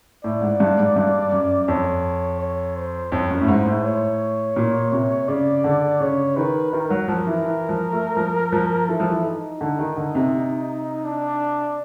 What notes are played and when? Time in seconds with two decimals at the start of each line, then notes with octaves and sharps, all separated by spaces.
0.24 A2 D5
0.42 G#2
0.60 G2
0.78 G#2
0.96 G2
1.32 F#2
1.68 F2 C#5
2.40 C#5
2.76 C5
3.12 F2 C#5
3.31 F#2
3.41 A2
3.48 G#2 C5
3.66 A2
3.84 C#5
4.56 A#2
4.92 C3
5.28 C#3 D5
5.64 D3
6.00 C#3 C#5
6.36 D#3 B4
6.72 D#3 A#4
6.90 F#3
7.08 F3
7.27 E3
7.44 E3
7.69 F3
7.93 A3
8.17 F3
8.52 F3
8.89 E3 A4
9.00 F3
9.10 E3
9.24 D#4
9.61 D3
9.79 D#3
9.97 D3
10.15 C3
11.05 D4